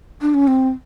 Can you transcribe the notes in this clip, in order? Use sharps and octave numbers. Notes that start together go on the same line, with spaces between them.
D4
C#4
C4